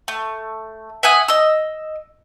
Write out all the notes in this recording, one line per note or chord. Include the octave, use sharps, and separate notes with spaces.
A3
E5 F#5 G#5 D#6
D#5 E6